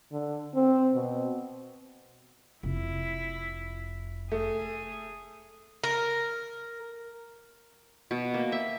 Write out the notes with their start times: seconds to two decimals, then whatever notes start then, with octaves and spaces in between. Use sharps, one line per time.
0.12 D3
0.54 C4
0.94 B2
2.63 F1 E4
4.32 A3 G#4
5.84 A#4
8.11 B2
8.34 A#3
8.52 E5